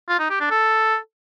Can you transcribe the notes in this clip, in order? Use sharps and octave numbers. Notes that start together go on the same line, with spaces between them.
F4
D#4
G4
D4
A4